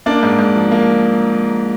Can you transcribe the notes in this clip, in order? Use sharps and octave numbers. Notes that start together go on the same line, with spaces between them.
A#3 D4 D5
G#2
G#2
F3
A#3